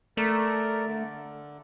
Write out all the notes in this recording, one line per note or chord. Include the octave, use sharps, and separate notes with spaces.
A3 A#4 D5
D3